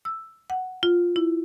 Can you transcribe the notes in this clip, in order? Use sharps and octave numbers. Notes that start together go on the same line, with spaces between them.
E6
F#5
F4
E4